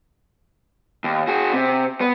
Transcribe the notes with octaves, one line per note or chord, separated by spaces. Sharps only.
D#2
F#4 G#4
C3
B3